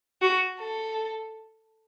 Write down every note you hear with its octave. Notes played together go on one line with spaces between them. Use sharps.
F#4
A4